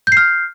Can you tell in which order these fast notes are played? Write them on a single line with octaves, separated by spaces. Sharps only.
G6 C7 F6